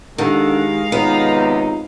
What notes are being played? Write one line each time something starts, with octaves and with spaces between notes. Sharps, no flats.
D#3 G#3 D4 G4 A4 F5 F#5
G#1 C3 B3 D#4 F4 C#5 A#5